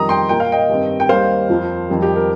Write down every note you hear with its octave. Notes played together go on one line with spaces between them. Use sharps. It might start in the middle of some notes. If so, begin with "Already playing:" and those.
Already playing: F2 D#3 G3 A#5 D#6
G5 C6
A#2 A#3 G5
F5
D#5 G5
G2 D#3 C4
G5
D#2 D#3 G3 A#3 C5 F5
F2 F3 A#3
F2 D#3 G3
G4
A#4